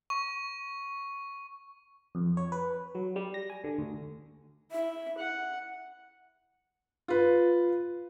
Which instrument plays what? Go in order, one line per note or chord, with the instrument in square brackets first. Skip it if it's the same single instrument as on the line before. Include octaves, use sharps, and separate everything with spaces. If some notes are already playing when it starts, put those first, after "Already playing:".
[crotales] C#6
[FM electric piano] F2
C#5
B4
F#3
G3
A#6
G#5
D3
D2
[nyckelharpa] E4 [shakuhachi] E5
[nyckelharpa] F#5
[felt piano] F4 B4